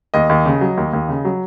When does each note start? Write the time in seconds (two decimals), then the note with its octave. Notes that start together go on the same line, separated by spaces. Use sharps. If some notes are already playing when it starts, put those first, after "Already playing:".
0.14 D#2 D#5
0.29 D#2
0.45 C#3
0.61 F#3
0.77 D#2
0.93 D#2
1.09 C#3
1.25 F#3